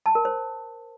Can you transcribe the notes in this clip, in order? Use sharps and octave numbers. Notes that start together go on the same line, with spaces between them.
A5
A#4
C5